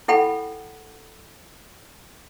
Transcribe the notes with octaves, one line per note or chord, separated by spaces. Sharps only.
E4 A4 F#5 G5 B5